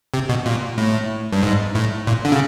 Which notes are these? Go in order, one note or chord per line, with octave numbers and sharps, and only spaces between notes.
C3
B2
A#2
A2
G2
G#2
A2
A#2
D3
C#3